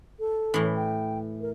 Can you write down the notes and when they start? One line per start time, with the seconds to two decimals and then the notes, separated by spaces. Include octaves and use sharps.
0.19 A4
0.54 A2 E3
0.76 G5
1.41 A#4